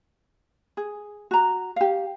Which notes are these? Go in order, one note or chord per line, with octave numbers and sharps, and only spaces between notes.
G#4
F#4 A#5
G4 F5